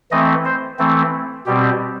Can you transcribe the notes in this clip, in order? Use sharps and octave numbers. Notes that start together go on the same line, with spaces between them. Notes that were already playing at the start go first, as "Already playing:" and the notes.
E3 A3 C4 D#5
C5
E3 A3 C4
B2 G3 C4 G4